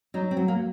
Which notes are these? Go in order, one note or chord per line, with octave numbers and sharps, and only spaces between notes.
F#3 D#4
C4
F#3
A#3